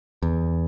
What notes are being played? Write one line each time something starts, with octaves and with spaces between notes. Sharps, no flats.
E2